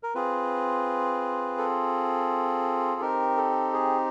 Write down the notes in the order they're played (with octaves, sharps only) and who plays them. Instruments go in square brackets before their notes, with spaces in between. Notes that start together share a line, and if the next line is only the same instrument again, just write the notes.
[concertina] A#4
C4 F4 G#4 B4
A4
C4 D#4 G4 A#4
A4
G#4